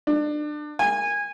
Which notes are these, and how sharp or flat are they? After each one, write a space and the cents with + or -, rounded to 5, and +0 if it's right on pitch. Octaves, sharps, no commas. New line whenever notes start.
D4 +30
G#5 -20